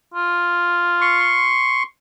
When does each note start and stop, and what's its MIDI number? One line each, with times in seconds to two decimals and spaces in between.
0.14 1.56 65
1.01 1.83 84
1.01 1.83 85